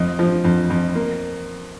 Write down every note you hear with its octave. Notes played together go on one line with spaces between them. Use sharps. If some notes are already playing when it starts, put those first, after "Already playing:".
Already playing: F2 D#5
F3
F2
F2
A#3